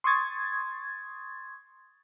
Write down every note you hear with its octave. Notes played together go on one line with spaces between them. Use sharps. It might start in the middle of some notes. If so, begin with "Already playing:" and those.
C6 C#6 D#6 G#6 A6